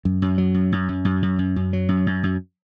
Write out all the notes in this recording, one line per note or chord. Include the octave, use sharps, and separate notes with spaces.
F#2
F#2
F#3
F#2
F#2
F#2
F#2
F#2
F#2
F#2
F#3
F#2
F#2
F#2